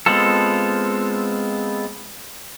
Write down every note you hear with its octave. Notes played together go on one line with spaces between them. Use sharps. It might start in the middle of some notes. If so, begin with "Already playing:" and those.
G#3 B3 C4 F4 A4